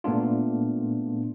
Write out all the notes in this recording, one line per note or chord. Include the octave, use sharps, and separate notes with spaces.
A#2 A3 B3 D4 F4